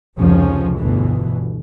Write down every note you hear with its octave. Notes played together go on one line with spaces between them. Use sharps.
F1 C#2 F3 C#4
G1 D2 B2 E3